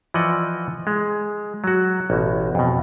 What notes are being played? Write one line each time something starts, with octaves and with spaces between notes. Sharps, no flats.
E3 F3 D5 D#5 F#5
G#3
F#3 F#4
A1 B2
F2 B2